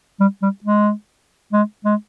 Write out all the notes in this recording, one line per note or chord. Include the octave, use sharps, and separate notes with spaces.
G3
G3
G#3
G#3
G#3